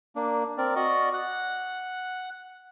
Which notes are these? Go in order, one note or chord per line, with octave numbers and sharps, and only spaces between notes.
A#3 D4
C4 A#4 D5
F#4 D5 D#5 C#6
F#5